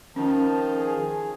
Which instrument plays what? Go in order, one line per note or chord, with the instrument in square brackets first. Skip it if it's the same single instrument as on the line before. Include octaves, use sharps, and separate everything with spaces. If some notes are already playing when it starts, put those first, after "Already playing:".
[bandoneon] D#3 F3 [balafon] C#4 [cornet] A5
[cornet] G#4